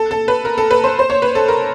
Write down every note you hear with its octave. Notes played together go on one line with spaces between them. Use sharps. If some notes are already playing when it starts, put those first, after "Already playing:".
Already playing: A4
A4
B4
A#4
A4
B4
C5
C5
C#5
B4
A4
A#4